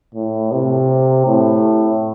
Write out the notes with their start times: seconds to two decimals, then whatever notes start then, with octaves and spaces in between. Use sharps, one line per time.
0.15 A2
0.52 C3
1.27 A2